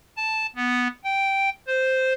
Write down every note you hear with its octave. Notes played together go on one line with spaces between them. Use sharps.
A5
B3
G5
C5